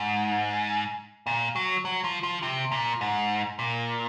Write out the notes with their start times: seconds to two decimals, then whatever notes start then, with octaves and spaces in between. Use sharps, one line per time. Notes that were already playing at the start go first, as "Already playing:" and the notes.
Already playing: G#2
1.27 A#2
1.55 F#3
1.85 F#3
2.04 F3
2.23 F3
2.43 C3
2.72 A#2
3.01 G#2
3.59 A#2